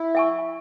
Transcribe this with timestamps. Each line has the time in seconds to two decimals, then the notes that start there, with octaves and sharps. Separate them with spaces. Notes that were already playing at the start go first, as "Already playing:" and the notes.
Already playing: E4
0.15 E5 G#5 C#6